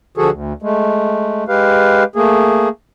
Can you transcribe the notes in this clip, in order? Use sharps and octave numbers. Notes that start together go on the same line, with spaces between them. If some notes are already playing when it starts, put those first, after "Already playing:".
D3 F3 F#4 G#4 A4
D2
G#3 A3
G#3 G4 B4 F5
A3 A#3 G#4